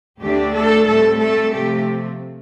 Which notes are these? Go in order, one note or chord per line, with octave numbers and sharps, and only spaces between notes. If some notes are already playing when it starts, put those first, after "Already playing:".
D2 D3 A3 D4 G4
A3 A4
A2 G3 A3 C4 A4
A3 A4
C3 F3 A3 C4 G4